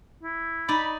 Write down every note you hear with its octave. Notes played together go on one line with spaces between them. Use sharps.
E4
D#4 D5 B5